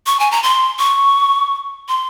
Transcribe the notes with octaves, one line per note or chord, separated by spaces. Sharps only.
C#6
G#5
A#5
C6
C#6
C6